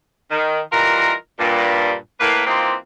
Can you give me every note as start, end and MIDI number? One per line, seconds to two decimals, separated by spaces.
0.31 0.59 51
0.72 1.12 52
0.72 1.12 55
0.72 1.12 63
0.72 1.12 65
0.72 1.12 70
1.38 1.93 43
1.38 1.93 46
2.20 2.43 45
2.20 2.43 58
2.20 2.43 71
2.46 2.74 52
2.46 2.74 58
2.46 2.74 60
2.46 2.74 63
2.46 2.74 65
2.46 2.74 67